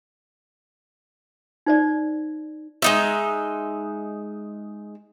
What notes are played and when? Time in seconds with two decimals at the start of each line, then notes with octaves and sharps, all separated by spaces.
1.66 D#4 C5 D5
2.82 G#3 D#4 E5